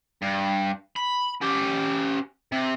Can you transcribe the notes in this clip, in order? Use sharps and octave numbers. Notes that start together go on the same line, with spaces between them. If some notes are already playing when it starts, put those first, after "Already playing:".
G2
B5
C#4 G4
C3